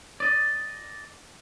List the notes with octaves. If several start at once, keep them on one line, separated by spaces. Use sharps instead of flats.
D5 D#5